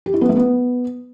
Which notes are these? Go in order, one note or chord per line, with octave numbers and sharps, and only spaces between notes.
G4
E4
B3
A3
B3